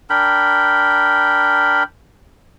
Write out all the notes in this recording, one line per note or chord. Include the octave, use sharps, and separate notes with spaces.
D4 A#4 G5 B5